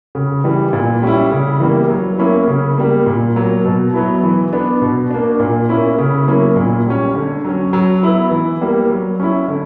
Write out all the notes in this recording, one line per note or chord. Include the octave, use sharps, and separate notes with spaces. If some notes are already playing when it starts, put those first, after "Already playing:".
C#3
E3 G3
A#2
G3 C#4 E4
C#3
E3 G3 A#3
F#3
A#3 C#4 E4
C#3
G3 A#3
A#2
F#3 A#3
B2
F#3 B3 E4
E3
B3 D4
B2
A#3 D4
A#2
A#3 C#4 E4
C#3
F#3 A#3 C#4 E4
A#2
G3 C#4
D3
F#3 C#4
F#3
B3 E4
E3
G3 A#3
F#3
C#4 E4
D3